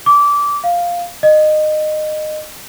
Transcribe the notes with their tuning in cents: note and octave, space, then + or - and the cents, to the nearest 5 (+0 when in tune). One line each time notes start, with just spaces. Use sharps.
D6 -20
F5 +0
D#5 -20